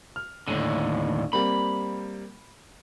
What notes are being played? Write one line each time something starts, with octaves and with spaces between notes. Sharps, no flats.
F6
D#2 A2 D3 D#7
G3 A#3 C4 B5